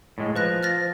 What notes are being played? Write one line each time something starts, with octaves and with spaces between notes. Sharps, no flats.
A2 G#3
F3 B4 F#6 A#6
F6 A6 A#6